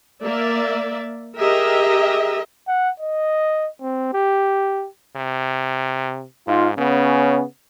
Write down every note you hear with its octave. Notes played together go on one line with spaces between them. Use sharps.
A#3 D5 E5
G4 G#4 A#4 D#5 E5
F#5
D#5
C4
G4
C3
G#2 D#4 F4
C#3 B3 C#4